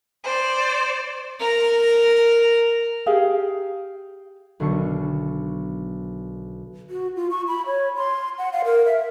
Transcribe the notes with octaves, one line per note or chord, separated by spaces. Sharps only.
C5 D5
A#4 A#5
G4 G#4 F5
B1 D3 D#3 C#6 C#7
F#4
F4
C#6
B5
C#5
C6
F#5
F5
A#4
E5